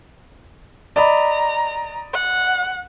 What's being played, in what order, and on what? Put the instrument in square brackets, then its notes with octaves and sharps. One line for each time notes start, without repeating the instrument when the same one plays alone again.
[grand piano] D5 D#5 B5 [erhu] A#5
[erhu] F#5